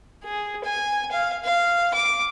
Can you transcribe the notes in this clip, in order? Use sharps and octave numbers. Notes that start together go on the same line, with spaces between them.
G#4
G#5
F5
F5
D6